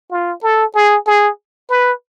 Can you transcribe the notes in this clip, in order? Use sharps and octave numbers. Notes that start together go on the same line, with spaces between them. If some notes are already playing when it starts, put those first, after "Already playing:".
F4
A4
G#4
G#4
B4